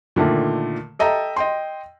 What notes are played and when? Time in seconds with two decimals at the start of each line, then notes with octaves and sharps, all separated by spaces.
0.16 A#2 D3 D#3 A3
0.99 A4 D#5 E5 G5 A#5
1.36 D#5 G5 C6